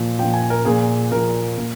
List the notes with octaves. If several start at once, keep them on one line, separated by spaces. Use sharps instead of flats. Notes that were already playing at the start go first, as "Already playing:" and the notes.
Already playing: A#2 F3
A#2 F3 G5
G#5
A#4
A#2 F3 G#4
A#2 F3 A#4
A#2